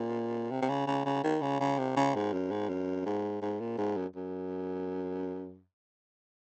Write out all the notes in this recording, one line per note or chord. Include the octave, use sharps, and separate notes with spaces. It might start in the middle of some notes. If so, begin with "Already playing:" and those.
Already playing: A#2
C3
C3
C#3
C#3
C#3
D#3
C#3
C#3
C3
C#3
G#2
F#2
G#2
F#2
G#2
G#2
A#2
G#2
F#2
F#2